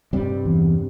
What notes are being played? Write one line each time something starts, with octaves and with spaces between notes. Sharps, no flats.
G2 C3 G3
E2